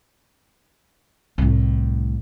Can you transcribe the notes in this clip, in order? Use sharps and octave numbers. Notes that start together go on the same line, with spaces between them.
C2 A2